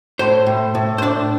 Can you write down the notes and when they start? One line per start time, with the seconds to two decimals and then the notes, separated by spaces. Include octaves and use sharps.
0.19 A2 C5
0.47 A2
0.75 A2
0.98 C5
1.02 D4 D5